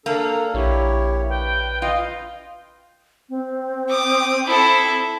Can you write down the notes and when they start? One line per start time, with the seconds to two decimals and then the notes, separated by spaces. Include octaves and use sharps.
0.06 A#3 D4 A4
0.54 A#1 E4 G4 C#5
1.29 B4 G5
1.82 F4 D#5
3.29 C4
3.89 D6 D#6
4.46 E4 A4